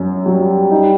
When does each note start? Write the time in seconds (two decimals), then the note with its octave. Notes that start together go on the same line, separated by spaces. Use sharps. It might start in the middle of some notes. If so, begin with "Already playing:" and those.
Already playing: F#2 F#3
0.25 F#3 G3
0.71 D#4